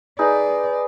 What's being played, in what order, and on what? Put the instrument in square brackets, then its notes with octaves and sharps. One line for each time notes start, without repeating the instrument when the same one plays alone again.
[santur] D#4 G#4 B4 [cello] D5